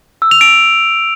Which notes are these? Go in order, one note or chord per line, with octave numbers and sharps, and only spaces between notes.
E6
F7
D7